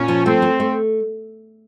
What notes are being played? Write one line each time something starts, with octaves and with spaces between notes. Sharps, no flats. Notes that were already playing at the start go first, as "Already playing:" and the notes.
Already playing: A#2 C#4
F3
A3 C4
A3
A3